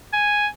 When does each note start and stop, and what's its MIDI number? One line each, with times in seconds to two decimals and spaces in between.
0.13 0.48 80